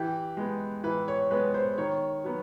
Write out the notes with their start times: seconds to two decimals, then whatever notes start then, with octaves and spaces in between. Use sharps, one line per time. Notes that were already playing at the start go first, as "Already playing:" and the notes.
Already playing: E3 G4
0.37 G#3 B3
0.83 E3 B4
1.08 C#5
1.31 G#3 B3 B4
1.54 C5
1.78 D#3 C#5
2.24 F#3 B3